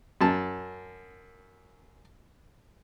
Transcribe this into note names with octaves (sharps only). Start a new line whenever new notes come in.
F#2 A5